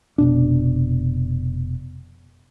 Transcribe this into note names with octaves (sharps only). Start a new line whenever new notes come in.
F1 B2 D4